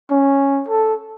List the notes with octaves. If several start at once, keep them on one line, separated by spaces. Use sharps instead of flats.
C#4
A4